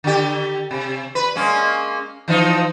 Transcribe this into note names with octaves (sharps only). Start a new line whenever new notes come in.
D3 G4
C3
B4
G#3 A#3 C#4
E3 F3 D#4